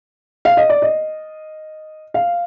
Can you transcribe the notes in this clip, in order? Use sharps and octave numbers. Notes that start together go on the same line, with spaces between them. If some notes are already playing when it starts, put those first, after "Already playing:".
F5
D#5
D5
D#5
F5